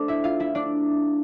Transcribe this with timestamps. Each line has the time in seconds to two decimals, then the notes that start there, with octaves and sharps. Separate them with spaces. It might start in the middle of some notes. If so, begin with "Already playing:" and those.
Already playing: A3 D4 A4 C5 D5
0.08 E4 E5
0.24 F4 F5
0.40 E4 E5
0.55 D4 D5